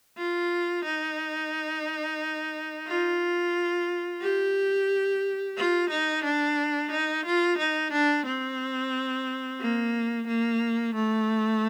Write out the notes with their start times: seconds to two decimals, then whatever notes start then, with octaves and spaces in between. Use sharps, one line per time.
0.18 F4
0.85 D#4
2.87 F4
4.22 G4
5.57 F4
5.90 D#4
6.24 D4
6.91 D#4
7.25 F4
7.58 D#4
7.92 D4
8.26 C4
9.61 A#3
10.28 A#3
10.95 A3